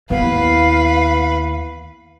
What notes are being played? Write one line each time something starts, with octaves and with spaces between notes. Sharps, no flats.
D#2 B3 E4 B4 F5 F#5